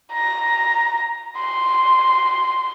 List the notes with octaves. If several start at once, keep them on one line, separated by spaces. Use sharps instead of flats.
A#5
C6